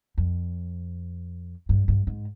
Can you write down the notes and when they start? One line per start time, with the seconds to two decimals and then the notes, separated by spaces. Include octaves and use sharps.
0.18 F2
1.69 G2
1.88 G2
2.07 G#2